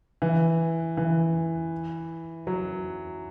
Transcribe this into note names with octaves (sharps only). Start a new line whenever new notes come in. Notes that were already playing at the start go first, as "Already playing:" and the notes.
E3
E3
F#3